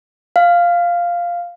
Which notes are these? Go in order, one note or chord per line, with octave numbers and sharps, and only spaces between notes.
F5